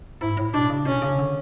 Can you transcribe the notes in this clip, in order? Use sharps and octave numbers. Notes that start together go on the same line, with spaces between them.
G#2 E4
A2
B2 D4
C#3
B2 C#4
C#3
D3